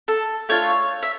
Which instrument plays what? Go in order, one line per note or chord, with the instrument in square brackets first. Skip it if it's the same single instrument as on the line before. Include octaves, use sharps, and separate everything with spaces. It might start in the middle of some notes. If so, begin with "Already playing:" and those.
[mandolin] A4
A3 D4 F4 C#5
E5